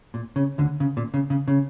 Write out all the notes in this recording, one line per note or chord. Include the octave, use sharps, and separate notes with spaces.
A#2
C#3
D2 D3
C#3
A#2
C#3
C#3
C#3